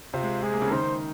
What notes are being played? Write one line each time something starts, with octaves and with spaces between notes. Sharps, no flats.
C3 C4 F4
G#3
G#3 G#4
A#3
C#3 C#4
D#3 D#4 C5